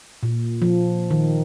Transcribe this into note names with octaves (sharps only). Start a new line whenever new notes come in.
A#2
F3
D#3